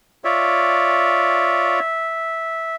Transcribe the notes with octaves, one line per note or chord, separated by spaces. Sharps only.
F4 C#5 D5 E5